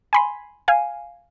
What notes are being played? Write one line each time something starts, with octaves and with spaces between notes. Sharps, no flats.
G#5 B5 C6
F5 G#5